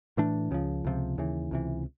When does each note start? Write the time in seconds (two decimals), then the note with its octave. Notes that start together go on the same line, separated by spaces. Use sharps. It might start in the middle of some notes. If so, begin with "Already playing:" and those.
0.17 A2 E3 A3 D4
0.51 C#2 C#3 F3
0.85 C#2 C3 F3
1.18 D#2 C#3 E3
1.51 C#2 C3 E3